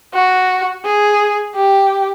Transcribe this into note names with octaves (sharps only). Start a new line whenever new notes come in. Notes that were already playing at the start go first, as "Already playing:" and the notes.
F#4
G#4
G4